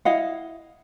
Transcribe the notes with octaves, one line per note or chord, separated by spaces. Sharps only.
E4 D#5 F5 F#5